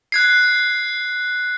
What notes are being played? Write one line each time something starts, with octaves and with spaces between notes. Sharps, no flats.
F#6 G#6 C7